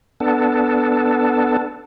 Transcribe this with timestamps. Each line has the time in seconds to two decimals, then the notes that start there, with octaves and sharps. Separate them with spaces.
0.20 B3 D4 A4